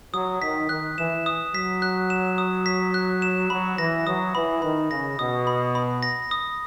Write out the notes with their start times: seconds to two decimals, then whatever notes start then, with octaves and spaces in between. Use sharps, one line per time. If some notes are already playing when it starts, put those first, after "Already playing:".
0.13 F#3 D#6
0.41 D#3 B6
0.69 D#3 F#6
0.98 E3 E7
1.26 D#6
1.54 F#3 B6
1.82 F#6
2.10 E7
2.38 D#6
2.66 B6
2.94 F#6
3.22 E7
3.50 F#3 B5
3.78 E3 A#6
4.07 F#3 D#6
4.35 E3 B5
4.62 D#3 B5
4.91 C#3 A#6
5.19 B2 D#6
5.47 B5
5.75 B5
6.03 A#6
6.31 D#6